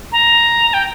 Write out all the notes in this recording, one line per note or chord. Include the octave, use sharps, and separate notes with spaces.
A#5
G5